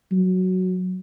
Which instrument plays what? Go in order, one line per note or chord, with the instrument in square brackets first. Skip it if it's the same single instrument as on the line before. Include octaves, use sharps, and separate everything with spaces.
[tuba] F#3